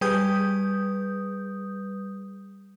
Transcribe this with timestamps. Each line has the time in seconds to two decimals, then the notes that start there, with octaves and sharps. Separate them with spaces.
0.01 G3 G#4 B4 D#6 G6